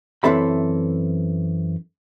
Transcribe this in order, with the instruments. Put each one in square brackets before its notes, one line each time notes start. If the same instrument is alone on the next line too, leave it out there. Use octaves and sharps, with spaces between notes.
[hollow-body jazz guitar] F#2 E3 C4 A4 E5 B5